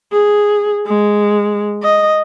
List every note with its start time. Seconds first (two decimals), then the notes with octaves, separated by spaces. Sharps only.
0.13 G#4
0.87 G#3
1.83 D#5